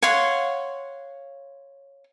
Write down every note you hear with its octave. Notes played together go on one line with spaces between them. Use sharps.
C#5 F5 F#5 C6